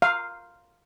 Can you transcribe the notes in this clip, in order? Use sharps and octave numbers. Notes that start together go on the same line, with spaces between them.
F5